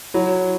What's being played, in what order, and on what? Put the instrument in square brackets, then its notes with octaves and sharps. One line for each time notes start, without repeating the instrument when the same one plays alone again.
[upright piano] F#3 [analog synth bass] E4